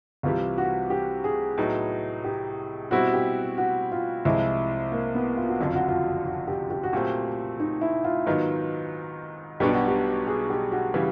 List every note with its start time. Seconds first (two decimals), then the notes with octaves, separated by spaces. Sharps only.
0.23 C2 C3 E3 G3 F4
0.58 F#4
0.90 G4
1.24 G#4
1.58 A2 F#3 B3 D#4
2.24 G4
2.91 B2 G3 C4 E4 F#4
3.14 G4
3.58 F#4
3.92 F4
4.25 C2 C3 F3 G#3 E4
4.92 A#3
5.15 B3
5.37 F4
5.49 F#4
5.60 F#1 F2 D3 F#3 F4
5.75 F#4
5.88 F4
6.25 F#4
6.48 G4
6.70 G4
6.83 F#4
6.93 A#2 F#3 A3 C4 G4
7.60 D#4
7.81 E4
8.04 F4
8.26 G#2 D#3 F#3 B3
9.60 B1 B2 G3 B3 D4 G4
9.74 F#4
9.88 G4
10.27 G#4
10.50 G4
10.72 F#4
10.94 C#3 E3 G3